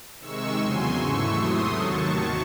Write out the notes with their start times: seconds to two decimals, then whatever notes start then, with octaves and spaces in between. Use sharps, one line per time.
0.19 C3 D#3 G#3 C#6 E6
0.58 E2 C#3 F#3 G#5 C6
0.97 G#2 E3 A3 C#6 E6
1.36 C3 F#3 A3 C6 D#6
1.75 D#2 D#3 F#3 A5 C#6